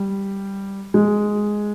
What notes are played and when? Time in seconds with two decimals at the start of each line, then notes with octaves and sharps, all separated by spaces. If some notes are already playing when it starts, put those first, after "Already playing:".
Already playing: G3
0.94 G#3